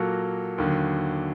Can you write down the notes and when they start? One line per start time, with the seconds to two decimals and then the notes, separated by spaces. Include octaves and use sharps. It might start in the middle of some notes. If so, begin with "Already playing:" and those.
Already playing: A#2 F#3 A#3 F#4 A4
0.58 D#2 D3 F#3